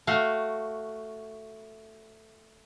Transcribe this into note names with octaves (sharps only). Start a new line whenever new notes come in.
A3 F#4 F5